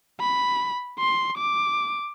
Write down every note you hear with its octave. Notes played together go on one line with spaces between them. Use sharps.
B5
C6
D6